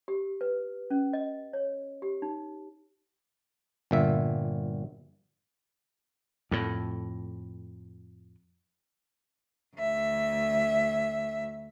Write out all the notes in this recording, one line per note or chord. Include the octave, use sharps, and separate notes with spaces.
G4
B4
C#4
D#5
C#5
G4
D#4
G1 A#2 E5
F2 A2
D2 E5